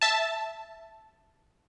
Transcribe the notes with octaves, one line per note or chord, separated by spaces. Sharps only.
E5 A5